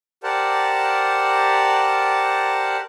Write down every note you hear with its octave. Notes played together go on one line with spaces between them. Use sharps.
G4 A#4 C5 D5 F#5 A5